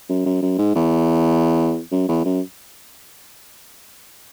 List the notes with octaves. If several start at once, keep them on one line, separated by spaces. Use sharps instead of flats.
F#2
F#2
F#2
G#2
E2
F#2
E2
F#2